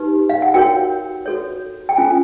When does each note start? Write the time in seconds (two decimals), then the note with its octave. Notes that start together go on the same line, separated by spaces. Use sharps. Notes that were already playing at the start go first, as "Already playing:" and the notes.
Already playing: D#4 G4 B4
0.30 F5
0.42 F#5
0.54 F#4 A#4 C#5 G5
1.26 F#4 A4 C#5
1.89 G5
1.98 C#4 F4 A4 G#5